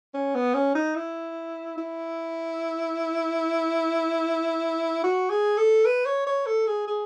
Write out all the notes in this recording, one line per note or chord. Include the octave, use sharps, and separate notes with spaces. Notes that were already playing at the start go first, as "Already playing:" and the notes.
C#4
B3
C#4
D#4
E4
E4
F#4
G#4
A4
B4
C#5
C#5
A4
G#4
G#4